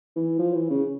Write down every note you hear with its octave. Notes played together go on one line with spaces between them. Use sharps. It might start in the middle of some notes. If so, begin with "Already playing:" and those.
E3
F3
E3
C#3